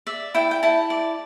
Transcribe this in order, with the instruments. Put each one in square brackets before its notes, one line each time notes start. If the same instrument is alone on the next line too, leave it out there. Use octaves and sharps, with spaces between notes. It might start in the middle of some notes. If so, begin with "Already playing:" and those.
[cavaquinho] D5 E5
E4 G5
G5
E4 A5
D5